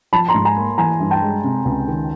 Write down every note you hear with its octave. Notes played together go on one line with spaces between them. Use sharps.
F3 A5 B5
A#5 C6
G#2
G#5 A#5
A#3
E3 G#5 A#5
G2
G5 A5
G#3
C3
C#2
D#3